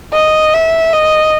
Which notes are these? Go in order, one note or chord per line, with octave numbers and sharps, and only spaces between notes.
D#5
E5
D#5